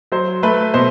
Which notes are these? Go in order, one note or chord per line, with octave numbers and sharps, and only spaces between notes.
F#3 C5
A3 B4
B2 C5